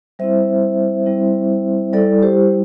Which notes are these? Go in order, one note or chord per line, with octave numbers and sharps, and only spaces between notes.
G3 C4 E4 C5 E5
G3 C4 E4
G3 E4 A4 D5
G4 C5